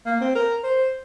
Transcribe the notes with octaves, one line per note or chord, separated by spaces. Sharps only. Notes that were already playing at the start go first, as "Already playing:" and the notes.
A#3
C4
A#4
C5